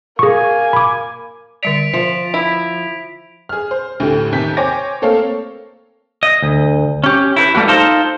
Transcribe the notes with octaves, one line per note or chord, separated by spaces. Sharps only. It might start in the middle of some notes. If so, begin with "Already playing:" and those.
A#3 G#4 G#5 C#6
B5 D6
D3 G3 D5 B6 D7 F7
F3 E5
E4
G#4 F6
C5
D2 A2 G4
D#2 C3 G6 B6
C5 C#5 G5 G#5 D6 A#6
A3 A#3 C4 A4 C#5 F5
D#5
D2
C#4 G4
E4 A#4 B4
G3 A3 A#3 F#4
D#4 F4 A4 A#4 C5